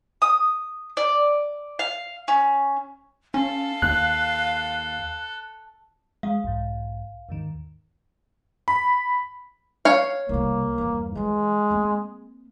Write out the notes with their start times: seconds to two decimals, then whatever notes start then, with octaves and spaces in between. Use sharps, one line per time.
0.22 D#6
0.97 D5
1.79 F5
2.28 C#4
3.34 C#4 A4 F5
3.82 D#2 F#6
6.23 G#3 F5
6.44 B1 G#2
7.29 D#2 G#2 D#3
8.68 B5
9.85 C#5 F5
10.29 C2 B2 A#3
10.78 E2 G2
11.15 E3 F#3 G#3
11.70 A#3 C4